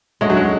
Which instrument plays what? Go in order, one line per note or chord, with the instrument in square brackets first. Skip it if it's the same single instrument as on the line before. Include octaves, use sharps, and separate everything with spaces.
[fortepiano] G#3 [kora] A3 C#4 F#4
[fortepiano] F#3
G#3